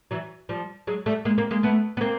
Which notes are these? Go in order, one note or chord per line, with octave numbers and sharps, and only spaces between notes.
E3 F#3
F3 G3
F#3 G#3
G3 A3
G#3 A#3
A#3 C4
G#3 A#3
A3 B3
B3
A#3 C4